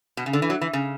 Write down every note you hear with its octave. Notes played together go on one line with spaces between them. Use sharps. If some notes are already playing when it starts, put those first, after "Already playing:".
B2
C#3
D3
E3
F#3
E3
C#3